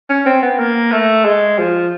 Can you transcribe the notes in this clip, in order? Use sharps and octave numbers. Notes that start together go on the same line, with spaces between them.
C#4
C4
B3
A#3
A3
G#3
F3